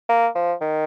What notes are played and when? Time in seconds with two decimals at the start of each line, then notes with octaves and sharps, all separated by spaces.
0.09 A#3
0.35 F3
0.61 D#3